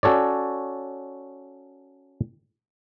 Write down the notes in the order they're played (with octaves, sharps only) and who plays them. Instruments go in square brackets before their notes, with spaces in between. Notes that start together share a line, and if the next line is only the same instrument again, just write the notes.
[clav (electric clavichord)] C#4 F#4 A4 C#5 D5